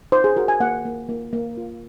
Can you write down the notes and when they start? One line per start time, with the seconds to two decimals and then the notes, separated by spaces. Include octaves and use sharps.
0.12 D#4 C5
0.24 G#4
0.36 F#4 A#4
0.48 G#5
0.60 A#3 F#5
0.85 A#3
1.09 A#3
1.33 A#3
1.57 F4